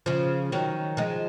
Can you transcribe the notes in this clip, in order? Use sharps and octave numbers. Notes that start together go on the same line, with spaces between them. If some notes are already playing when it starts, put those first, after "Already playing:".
C#3 F3
D#3 F#3
F3 G#3